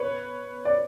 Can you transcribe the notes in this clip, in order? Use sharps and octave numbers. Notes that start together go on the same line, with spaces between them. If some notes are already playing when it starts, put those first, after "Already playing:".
Already playing: B4 C#5
D5